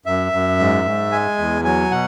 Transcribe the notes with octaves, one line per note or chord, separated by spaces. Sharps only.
F#2 E5
F#2
G#2
G#2
G#3 G#5
E2
F#3 G#5
B2 F#5